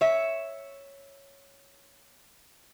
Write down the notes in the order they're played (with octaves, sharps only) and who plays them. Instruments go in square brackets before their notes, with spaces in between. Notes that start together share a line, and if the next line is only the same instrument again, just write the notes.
[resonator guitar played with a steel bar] C#5 E5